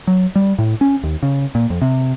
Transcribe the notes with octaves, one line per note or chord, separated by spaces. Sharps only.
F#3
G3
A2
C#4
D#2
C#3
A#2
F2
C3